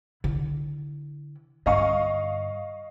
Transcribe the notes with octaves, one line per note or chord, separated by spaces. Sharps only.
D3 E4
G2 D3 D#5 F5 C#6